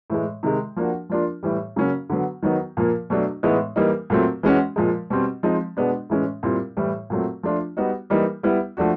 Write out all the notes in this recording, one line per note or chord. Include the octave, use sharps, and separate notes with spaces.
A2 E3 G#3
C3 D#3 G#3
F3 A#3 D4 F#4
F3 A#3 D4 F4
A2 E3 G3
C#3 F#3 A#3 C#4
D3 F#3 B3
D#3 F#3 B3 D#4
A#2 F3 A#3
B2 F#3 A3 D4
A2 E3 G#3 B3 D#4
E3 G3 A#3 D#4
A#2 F#3 A3 C4
E3 G#3 C#4 F#4
A#2 F3 G#3
B2 G3 C4
F3 G#3 C4 D#4
B2 G#3 B3 D4
A2 E3 G#3 C#4
A#2 G3 C4 E4
A2 E3 G3
A#2 F#3 A3 C4
F3 A3 D4 F4
G3 B3 D#4 F#4
E3 G3 A#3 D#4
G3 B3 E4
F3 A3 D4 F#4